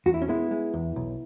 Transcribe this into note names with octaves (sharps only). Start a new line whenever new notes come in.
E2 F#4
E4
C#4
G#3 B3 E4
G#3
E2
B1